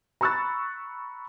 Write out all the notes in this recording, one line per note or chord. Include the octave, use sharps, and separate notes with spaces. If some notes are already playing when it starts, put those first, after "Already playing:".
A#5 B5 C#6 E6 F#6 A6